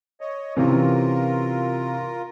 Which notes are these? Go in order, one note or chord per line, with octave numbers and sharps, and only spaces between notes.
C#5 D#5
C3 E3 C#4 F4 A#4